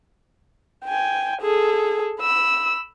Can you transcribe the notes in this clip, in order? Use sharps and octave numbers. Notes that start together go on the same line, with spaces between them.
G5 G#5
G#4 A4
B5 E6